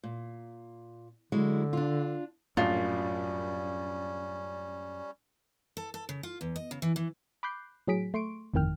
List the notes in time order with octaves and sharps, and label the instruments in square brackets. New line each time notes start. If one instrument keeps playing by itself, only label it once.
[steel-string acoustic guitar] A#2
[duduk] D3 [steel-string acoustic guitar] F#3 G#3 E4
[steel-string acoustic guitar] D4 F4
[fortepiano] A#1 A2 [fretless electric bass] F#2 [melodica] G3 C#4 [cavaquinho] F4
[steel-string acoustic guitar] A4
A4
C#3
F4
E2
D#5
C#3
E3
E3
[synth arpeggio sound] B5 D6 F#6 G6 C7
A2 F#3 G#4 B6 D7
A3 C6 C#6 D7
G1 F2 A2 D#3 G5 F6